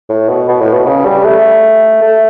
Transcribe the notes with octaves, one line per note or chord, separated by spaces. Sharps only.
A2
B2
B2
A2
B2
C#3
G3
A3
A3